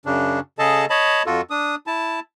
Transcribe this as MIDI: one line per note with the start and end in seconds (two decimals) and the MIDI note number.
0.06 0.40 42
0.06 0.40 49
0.06 0.40 62
0.59 0.85 49
0.59 0.85 68
0.59 0.85 69
0.59 0.85 75
0.59 0.85 81
0.90 1.23 73
0.90 1.23 75
0.90 1.23 81
0.90 1.23 83
1.26 1.41 41
1.26 1.41 65
1.26 1.41 66
1.26 1.41 69
1.50 1.75 62
1.50 1.75 87
1.87 2.20 64
1.87 2.20 81